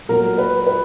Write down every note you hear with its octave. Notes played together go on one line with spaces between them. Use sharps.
A#2 F#3 A#4
B4
B4